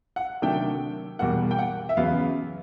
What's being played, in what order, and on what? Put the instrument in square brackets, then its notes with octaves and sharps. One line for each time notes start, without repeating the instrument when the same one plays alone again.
[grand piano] F#5
C3 D#3 F#3 A3 D4 G5
E2 B2 G3 A#3 F#5
G5
F#5
E5
E2 C#3 F#3 B3 F5